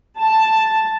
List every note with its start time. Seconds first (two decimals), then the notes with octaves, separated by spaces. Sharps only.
0.21 A5